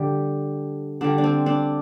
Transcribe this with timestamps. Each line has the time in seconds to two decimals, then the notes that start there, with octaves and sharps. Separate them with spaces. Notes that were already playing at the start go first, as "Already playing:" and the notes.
Already playing: D3 G3 G4
1.01 D3 G3 D4
1.18 D4
1.24 C4
1.46 D4